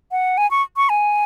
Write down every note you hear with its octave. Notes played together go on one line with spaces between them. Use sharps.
F#5
G#5
C#6
C#6
G#5